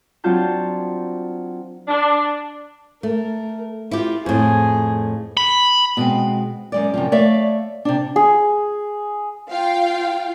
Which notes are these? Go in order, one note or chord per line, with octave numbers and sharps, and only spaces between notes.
F#3 C4 D4 F4 A5 G6
D4
A3 A#4
E4 F4 G4
F2 A2 G#4
B5
B2 G#3 C4
F#2 G#3 D5
F#2 C3 F3
A3 C#5 D5 E5 F5
C3 D4
G#4
F4 F5 G5